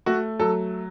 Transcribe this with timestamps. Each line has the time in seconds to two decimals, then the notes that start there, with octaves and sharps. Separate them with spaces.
0.06 A3 F#4
0.39 F#3 A4